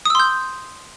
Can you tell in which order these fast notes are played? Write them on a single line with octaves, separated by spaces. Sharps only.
D#6 E6 C6 G6